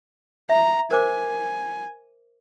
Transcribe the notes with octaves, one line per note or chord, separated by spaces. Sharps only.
E5 A#5
A#4 C5 G#5 D6